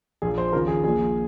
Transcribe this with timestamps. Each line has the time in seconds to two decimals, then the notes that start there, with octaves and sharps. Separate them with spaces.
0.22 A#1 A#2 F3 G#4
0.38 C5
0.52 D#2 C#3 F3 A#4
0.68 G#4
0.84 A#1 A#2 F3 G#4